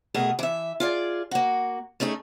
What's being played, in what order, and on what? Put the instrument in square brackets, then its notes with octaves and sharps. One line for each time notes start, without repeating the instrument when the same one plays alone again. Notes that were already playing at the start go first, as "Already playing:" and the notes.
[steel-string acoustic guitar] B2 A3 G#4 A#4 D#5
E3 E5
F4 G#4 D5
A#3 F#4
A3 C#4 D#4 G#4